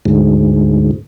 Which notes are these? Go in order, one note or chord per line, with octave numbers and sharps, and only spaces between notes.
D2 G#2